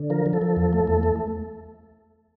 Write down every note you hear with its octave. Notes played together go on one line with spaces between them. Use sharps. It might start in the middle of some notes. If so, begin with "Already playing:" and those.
Already playing: D3
F3 A#4
F3
A4
F3
E2
A3
E2
A3